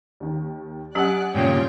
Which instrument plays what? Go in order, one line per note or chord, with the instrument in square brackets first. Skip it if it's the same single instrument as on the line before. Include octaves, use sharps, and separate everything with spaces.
[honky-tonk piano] D#2 D#3
[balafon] F#3 C#4 G4 [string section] D5 F#6 [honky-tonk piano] F#5 G#5 D#6
[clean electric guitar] G2 A#2 C#3 [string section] F4 C#5 G5